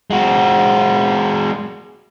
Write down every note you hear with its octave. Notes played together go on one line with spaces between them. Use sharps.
G#3 F#4